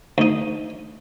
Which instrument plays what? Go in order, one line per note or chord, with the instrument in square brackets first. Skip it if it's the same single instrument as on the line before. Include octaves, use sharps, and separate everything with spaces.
[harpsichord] D2 D#4